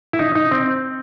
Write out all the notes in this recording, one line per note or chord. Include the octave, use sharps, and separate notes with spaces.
E4
D#4
D#4
C4